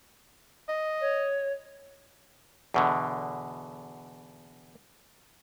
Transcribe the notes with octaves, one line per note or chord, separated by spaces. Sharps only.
D#5
C#5
E2 B2 D3